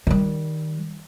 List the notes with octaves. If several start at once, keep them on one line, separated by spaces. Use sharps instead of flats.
D#3 G3